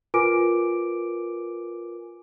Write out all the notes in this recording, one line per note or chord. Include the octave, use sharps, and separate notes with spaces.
F4 A#4 B4 G#5 D6 D7